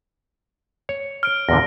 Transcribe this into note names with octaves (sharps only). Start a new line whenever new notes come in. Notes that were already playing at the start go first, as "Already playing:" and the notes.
C#5
F6 D7
E2 A#2 D3 A#6